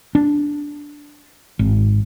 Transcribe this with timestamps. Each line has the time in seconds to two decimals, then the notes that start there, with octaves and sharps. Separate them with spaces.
0.15 D4
1.59 G#1